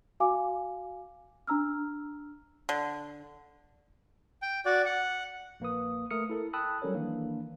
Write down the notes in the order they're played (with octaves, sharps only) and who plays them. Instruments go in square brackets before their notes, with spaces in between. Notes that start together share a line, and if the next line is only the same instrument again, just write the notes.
[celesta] F#4 F5 G#5 D6
D4 A#5 E6 F6
[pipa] D3
[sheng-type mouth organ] G5
F#4 D5
F#5
[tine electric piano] A#1 A#3 B4 D#6
A3 A#4 D#6 F6 C#7
E4 A4 A#4
G5 A5 B5 D#6 E6 F#6
F#3 G3 C#4 A4 A#4 C#5
D#3 E3 A#3 D4